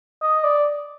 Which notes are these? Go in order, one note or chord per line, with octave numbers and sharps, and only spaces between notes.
D#5
D5